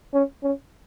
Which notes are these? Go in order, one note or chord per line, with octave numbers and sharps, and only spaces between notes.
C#4
C#4